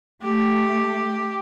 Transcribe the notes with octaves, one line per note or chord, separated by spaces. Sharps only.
A3 G4